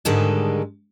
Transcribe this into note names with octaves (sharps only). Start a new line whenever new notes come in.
G#2 D3 D#3 G3 G#3 A4